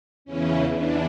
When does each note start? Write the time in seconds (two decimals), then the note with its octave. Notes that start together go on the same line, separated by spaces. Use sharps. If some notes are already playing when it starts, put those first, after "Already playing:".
0.25 E2 C#3 E3 C#4
0.72 E2 E3 D4